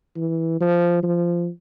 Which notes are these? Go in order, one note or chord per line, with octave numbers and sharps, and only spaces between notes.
E3
F3
F3